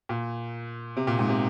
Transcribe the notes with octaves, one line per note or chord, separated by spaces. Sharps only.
A#2
C3
A#2
G#2
C3